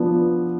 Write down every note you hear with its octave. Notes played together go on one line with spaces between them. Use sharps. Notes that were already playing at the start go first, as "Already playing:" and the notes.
Already playing: F3 B3 D4 F4